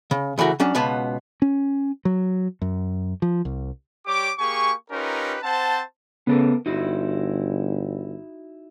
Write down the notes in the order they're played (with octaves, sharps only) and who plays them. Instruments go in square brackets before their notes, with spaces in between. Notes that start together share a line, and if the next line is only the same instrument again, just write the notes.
[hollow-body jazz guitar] C#3
C#3 E3 A3 F#4 A#4
F#3 C#4 D4
C#2 B2 B3 A5
[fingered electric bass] C#4
F#3
F#2
F3
C2
[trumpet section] G3 G4 C#5 D6
A#3 G4 G#4 G#5 C#6
C#4 D#4 F4 G4 A#4 B4
C4 C5 F#5 A5
[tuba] C#3 [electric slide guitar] B3 A4 A#4
[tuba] G1 [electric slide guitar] D#4 E4 F#4